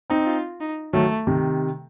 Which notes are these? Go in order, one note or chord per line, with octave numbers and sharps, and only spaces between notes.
C4 D#4
F4
D#4
D#3 F#3 A3
C3 D#3